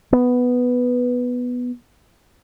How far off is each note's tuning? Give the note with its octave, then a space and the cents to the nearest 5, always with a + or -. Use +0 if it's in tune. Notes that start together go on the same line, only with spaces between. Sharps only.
B3 +0